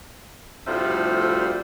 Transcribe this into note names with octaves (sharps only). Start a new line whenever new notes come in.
D2 A2 C3 F3 G3 E5